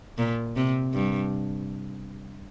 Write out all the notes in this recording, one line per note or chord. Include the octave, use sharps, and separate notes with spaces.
A#2
C3
G2